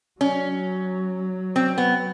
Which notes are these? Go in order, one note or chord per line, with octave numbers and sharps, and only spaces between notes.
F#3 C#4
C4
B3